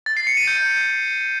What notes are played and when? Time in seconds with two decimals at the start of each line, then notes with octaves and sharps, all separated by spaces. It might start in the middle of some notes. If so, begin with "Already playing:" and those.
0.06 A6
0.17 C7
0.27 C#7
0.37 D#7
0.47 G6